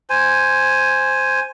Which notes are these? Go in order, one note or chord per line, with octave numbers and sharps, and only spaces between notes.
C5 G#5